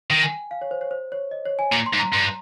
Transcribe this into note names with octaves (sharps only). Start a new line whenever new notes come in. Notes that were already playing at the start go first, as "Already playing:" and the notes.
D#3 G5
G#5
F5
C#5
C5
C#5
C5
C#5
D#5
C#5
G#5
A#2 A#5
C6
G#2
A#5
G2 C6